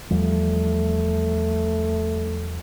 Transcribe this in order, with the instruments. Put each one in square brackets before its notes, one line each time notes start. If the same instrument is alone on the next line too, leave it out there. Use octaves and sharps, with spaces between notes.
[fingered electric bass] E2 F3 G3 [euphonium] A3